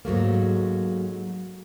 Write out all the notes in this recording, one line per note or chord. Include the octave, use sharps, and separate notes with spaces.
G#2 F#3 A3 A#3